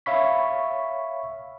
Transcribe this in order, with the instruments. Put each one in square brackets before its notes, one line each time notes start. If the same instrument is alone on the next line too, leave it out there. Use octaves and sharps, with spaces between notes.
[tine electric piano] C#5 E5 F5 B5 C#6 B6